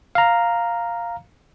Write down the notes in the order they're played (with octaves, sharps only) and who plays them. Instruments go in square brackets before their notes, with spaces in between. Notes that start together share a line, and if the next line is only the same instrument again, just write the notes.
[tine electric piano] F5 A#5